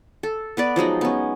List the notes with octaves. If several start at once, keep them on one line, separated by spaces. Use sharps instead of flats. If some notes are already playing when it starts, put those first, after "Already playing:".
A4
B3 B4 D5
F3 F#3 G#3 D#4
B3 C#4